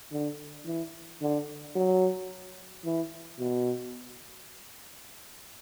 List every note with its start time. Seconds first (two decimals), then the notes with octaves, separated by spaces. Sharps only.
0.12 D3
0.66 E3
1.21 D3
1.75 F#3
2.85 E3
3.39 B2